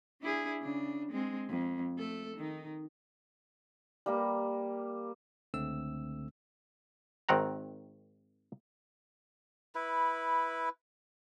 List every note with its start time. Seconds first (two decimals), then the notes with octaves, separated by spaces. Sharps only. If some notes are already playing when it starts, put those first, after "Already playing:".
0.21 D4 E4 G#4
0.62 C#3 D4
1.11 G#3 C4
1.49 F2
1.98 A3 A4
2.36 D#3 D#4
4.06 G3 A#3
5.54 C#2 D3 A3 C4 E6
7.29 G#1 D#3 C4 F#5 A#5
9.75 E4 B4